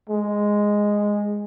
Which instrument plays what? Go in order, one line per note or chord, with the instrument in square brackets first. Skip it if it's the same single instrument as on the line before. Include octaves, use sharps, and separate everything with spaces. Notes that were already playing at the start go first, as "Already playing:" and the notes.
[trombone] G#3